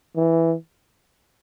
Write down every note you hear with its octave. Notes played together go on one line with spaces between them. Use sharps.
E3